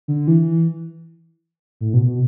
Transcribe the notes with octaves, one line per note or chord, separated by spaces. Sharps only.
D3
E3
A2
B2
B2